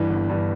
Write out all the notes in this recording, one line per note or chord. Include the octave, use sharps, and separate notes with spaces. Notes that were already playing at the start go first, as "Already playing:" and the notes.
Already playing: G2 E3
G1
G2 E3